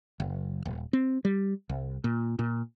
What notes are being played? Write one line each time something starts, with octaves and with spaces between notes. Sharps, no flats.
F#1
D#1
C4
G3
C2
A#2
A#2